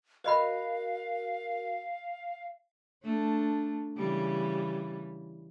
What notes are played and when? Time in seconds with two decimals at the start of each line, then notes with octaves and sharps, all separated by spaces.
0.24 F#4 A#4 B4 D#5 F5 B5
3.03 A3 D4
3.97 C#3 E3 G3